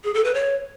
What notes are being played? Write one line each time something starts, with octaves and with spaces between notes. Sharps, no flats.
G#4
A4
B4
C#5